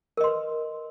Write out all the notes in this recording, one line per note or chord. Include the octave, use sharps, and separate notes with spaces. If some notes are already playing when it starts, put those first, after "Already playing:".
A#4 B4 D#5 C6